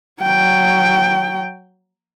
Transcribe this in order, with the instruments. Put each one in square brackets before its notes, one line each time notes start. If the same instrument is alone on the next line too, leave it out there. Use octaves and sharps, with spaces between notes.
[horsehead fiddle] F#3 G5